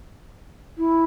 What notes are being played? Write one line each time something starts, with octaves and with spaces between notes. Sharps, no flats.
E4